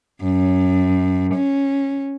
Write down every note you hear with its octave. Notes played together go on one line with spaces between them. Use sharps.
F#2
C#4